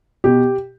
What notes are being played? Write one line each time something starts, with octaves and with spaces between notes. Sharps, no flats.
B2 G4